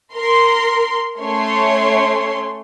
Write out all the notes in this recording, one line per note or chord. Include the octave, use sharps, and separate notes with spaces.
A#4 C6
A3 C#4 C#5 C6